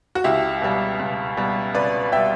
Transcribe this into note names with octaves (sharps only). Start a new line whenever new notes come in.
F#4
C#2 E4 G4
B2 G3
C#2
B2 G3
C#2 B4 D5
B2 G3 E5 G5